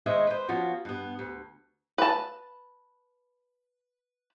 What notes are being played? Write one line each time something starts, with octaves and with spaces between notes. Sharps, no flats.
D#3 G#3 C5 C#5 D#5 E5
B4 C5
F3 B3 C#4 F4 F#4
G2 B3
D2
B4 A5